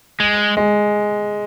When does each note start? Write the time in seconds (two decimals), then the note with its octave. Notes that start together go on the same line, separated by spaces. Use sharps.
0.20 G#3
0.57 G#3